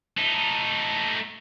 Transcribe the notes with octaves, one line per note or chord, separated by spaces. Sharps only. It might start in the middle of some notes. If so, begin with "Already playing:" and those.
A3 D#4